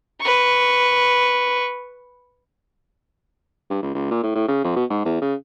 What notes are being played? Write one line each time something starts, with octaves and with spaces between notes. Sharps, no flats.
B4 C#6
G2
C#2
C#2
A#2
A2
A2
C#3
F2
B2
G#2
E2
C#3